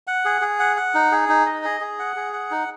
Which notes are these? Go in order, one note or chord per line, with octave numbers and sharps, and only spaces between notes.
F#5
G#4
G#4
F#5
F#5
D#4
G#4
D#4
D#5
G#4
G#4
F#5
G#4
F#5
D#4